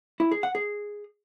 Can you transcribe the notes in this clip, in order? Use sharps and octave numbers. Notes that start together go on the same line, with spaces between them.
E4
G#4
F#5
G#4